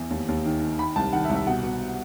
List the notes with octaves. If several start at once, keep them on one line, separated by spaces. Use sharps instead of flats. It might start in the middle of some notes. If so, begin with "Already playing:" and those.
Already playing: E2
D#2
D#2
D#3
D#3
D#3 B5
C2 A5
D#3 F#5
E5
C2
E5
B2 F#5
B2